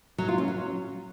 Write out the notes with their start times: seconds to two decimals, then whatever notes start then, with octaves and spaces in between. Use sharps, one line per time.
0.18 F#3
0.28 F4
0.38 C#4
0.48 F#3